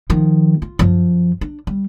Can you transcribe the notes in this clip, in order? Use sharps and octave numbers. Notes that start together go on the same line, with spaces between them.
D#3 F3
F4
F#2 F3
D4
G3